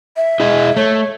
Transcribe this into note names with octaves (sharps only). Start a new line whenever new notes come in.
E5
E4 G#4 D#5
A3 C#5